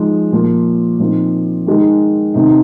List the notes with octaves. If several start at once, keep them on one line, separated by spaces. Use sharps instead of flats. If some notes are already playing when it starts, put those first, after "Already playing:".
Already playing: F3 G#3 D#4
A#2 F3 A#3
A#2 F3 C4 D#4
D#3 G#3 D#4
C3 D#3 C4 D#4